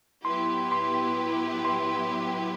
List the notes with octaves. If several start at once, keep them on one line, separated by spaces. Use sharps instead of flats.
F#3 B3 E4 G4 B4 C6
C6
C6